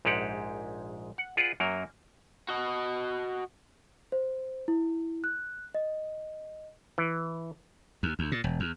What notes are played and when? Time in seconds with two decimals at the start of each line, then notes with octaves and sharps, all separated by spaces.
0.05 A#1 G#2 G#3 G4 F#5
1.18 F#5
1.37 F4 G#4 B4 D5 F#5
1.60 F#2 F#3 A#3 A#4
2.49 F#4 D#5
4.12 C5
4.68 E4
5.24 F#6
5.75 D#5
6.98 E3
8.03 D#2
8.19 D2
8.32 A#2
8.44 E1
8.60 E2